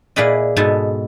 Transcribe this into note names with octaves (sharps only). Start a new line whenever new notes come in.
A#2 E4 G#4 B4 D5 D#5
G#2 B2 B3 A4 G#5 A5